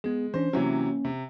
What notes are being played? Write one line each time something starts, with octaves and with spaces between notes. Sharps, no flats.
G#3 B3 G#4
E3 C#4 D4 C5
C3 E3 F#3 A#3 C#4
C3